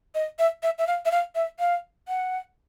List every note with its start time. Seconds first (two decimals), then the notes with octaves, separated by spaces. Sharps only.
0.15 D#5
0.39 E5
0.63 E5
0.79 E5
0.87 F5
1.05 E5
1.11 F5
1.35 E5
1.59 F5
2.08 F#5